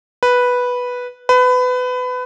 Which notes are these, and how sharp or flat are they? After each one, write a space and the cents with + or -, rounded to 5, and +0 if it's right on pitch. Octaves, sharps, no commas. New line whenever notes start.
B4 -5
B4 +25